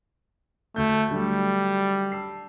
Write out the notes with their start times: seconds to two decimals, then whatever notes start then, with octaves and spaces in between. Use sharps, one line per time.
0.76 D2 A3 G6
1.11 D3 F#3 G3 A3
2.12 A5 E6 C7